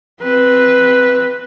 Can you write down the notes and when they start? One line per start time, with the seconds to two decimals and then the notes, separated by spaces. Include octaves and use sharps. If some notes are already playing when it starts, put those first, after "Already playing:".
0.22 C4 B4